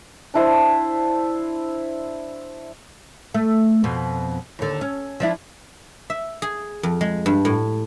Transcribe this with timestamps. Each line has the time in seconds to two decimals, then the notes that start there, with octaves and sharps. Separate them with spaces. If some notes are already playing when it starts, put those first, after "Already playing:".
0.34 D4 E4 C5
3.34 A3
3.84 F2 B2
4.59 D#2 D3
4.81 C#4
5.20 F3 D4 E4
6.10 E5
6.42 G#4
6.83 F2
7.01 G#3
7.26 G2
7.45 A2